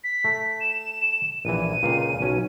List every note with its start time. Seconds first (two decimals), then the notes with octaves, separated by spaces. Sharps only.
0.04 B6
0.24 A3
0.61 E7
1.45 A#1 E3 D#7
1.83 C#2 A#2 F5
2.21 B1 C#4